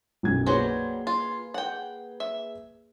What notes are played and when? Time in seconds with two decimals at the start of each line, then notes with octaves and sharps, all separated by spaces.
0.23 B1 F#2 G#6
0.47 F#3 G3 A#3 G#4 B4 C5
1.07 F4
1.54 F#5 G5
2.20 E5